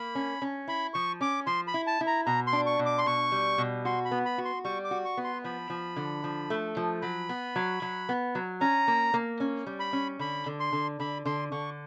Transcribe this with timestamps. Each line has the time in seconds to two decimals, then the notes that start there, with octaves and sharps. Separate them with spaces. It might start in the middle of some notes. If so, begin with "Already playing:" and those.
Already playing: A#3 B5
0.15 C#4
0.42 C#4
0.68 E4 B5
0.94 F3 C#6
1.21 C#4 D6
1.47 F3 C6
1.68 B5
1.74 E4
1.87 A5
2.01 E4
2.07 A#5
2.26 B2 A#5
2.47 C6
2.53 D4
2.66 C#6
2.79 B2
2.86 D6
2.98 C6
3.06 B2 C#6
3.32 G3
3.58 B2
3.85 F#4 C6
4.05 B5
4.11 B3
4.26 B5
4.38 F#4
4.45 C6
4.65 G3 C#6
4.84 D6
4.91 F#4
5.05 C#6
5.17 B3
5.24 C6
5.44 F3 B5
5.70 F3
5.96 D3
6.24 F3
6.50 A3
6.77 F3
7.02 F#3 B5
7.29 B3
7.56 F#3
7.82 F#3
8.09 B3
8.35 F#3
8.61 C#4 A#5
8.88 A#3
9.14 A#3
9.40 C#4
9.66 G3
9.80 B5
9.93 C#4
10.19 D3 B5
10.46 D3
10.60 C6
10.73 D3
11.00 D3 B5
11.25 D3 C6
11.51 D3 C#6